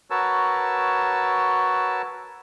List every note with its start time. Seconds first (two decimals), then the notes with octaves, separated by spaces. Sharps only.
0.10 F#4 A#4 B4 C#5 A5 E6